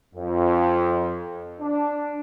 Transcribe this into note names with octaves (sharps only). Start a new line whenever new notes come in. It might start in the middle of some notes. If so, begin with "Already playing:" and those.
F2
D4